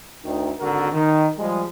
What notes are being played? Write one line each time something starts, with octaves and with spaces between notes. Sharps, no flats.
D2 D#3
G#1 D3 F#4 A#4
D#3
F3 G3 G#3